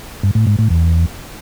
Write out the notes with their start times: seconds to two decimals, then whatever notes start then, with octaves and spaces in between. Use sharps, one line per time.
0.23 G2
0.35 A2
0.47 G#2
0.59 A2
0.70 E2